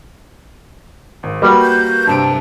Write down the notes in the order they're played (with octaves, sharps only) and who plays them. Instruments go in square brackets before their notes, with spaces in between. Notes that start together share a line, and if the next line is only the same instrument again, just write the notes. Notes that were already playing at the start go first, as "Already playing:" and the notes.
[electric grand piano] G#1
[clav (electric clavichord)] G3 [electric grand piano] A#3 F#4 B4
[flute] G6
[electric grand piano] G2 C3 D7 [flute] A5